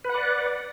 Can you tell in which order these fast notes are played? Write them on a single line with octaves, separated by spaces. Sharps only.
B4 F#5 D5